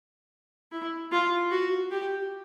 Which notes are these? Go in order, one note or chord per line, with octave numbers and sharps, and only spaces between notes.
E4
F4
F#4
G4